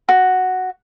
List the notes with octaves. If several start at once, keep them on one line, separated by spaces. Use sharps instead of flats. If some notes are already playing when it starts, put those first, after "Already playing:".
F#4